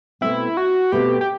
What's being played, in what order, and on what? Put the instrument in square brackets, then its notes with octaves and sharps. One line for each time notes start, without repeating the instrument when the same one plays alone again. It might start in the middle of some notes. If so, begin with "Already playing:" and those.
[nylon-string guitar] B2 A3 C4 [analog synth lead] E4
[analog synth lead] F#4
[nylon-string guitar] B2 A3 C4 [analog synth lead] G4
[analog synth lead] G4